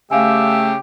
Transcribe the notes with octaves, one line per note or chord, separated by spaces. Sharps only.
C#3 A3 G4 E5 F5 G#5